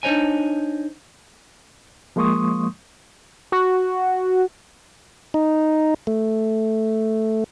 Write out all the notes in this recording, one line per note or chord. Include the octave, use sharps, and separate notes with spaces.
D4 D#4 C5 C#5 D#5 G#5
F3 G#3 A#3 C6 C#6 D#6
F#4
D#4
A3